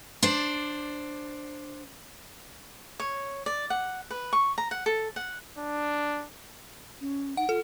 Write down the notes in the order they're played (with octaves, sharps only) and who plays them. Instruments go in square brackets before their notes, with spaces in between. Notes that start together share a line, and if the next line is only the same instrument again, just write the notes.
[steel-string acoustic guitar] D4 C5 D5
[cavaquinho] C#5
D5
F#5
B4
C#6
A#5
F#5
A4
F#5
[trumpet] D4
[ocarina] C#4
[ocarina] D#4 [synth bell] F#5
[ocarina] F4 [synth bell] A4